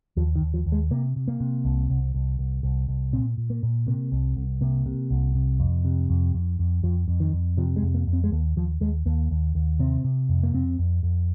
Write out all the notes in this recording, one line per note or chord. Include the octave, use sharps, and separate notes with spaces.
D#2 F3
D#3
D#2
F3
D#2
G#3
C3 A#3
C3
A#3
C3
C2
C2
C2
C2
C2
C2
A#2 C4
A#2
A#3
A#2
C3 A#3
C2
C2
C3 A#3
C3
C2
C3
F2
C3
F2
F2
F2
F2 F3
F2
D#3
F2
C3 F3
G#3
F2
A#3
F2
C4
G#3
D#2 A#3
D#2 F3
D#2 G#3
D#2 A#3
D#2
D#2
C3 C4
C3
F2
A#3
F2 C4
F2
F2